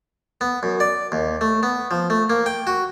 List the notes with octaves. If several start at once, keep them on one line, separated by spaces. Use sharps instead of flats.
B3
F#2
D5
D#2
A3
B3
F3
A3
A#3
G5
F#4